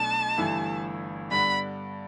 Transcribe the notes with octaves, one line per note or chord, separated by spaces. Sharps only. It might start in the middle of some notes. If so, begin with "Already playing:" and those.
Already playing: B1 B2 A3 D4 A5
G1 G2 E3 A3 E4
G2 D3 B3 D4 B5